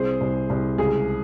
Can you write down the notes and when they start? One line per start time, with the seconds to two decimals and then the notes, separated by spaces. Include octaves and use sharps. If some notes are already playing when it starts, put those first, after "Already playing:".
Already playing: C2 C4 G#4 C5
0.21 C2
0.50 C2
0.78 C#2 G#4